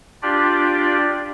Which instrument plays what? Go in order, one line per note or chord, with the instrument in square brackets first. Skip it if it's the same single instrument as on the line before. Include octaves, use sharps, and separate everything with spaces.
[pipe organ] D4 F4 G4 D5